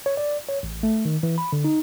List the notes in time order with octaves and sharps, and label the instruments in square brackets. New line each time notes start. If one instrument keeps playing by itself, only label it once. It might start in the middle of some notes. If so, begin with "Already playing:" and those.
[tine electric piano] C#5
D5
C#5
A1
A3
D#3
E3
B5
D3
D#4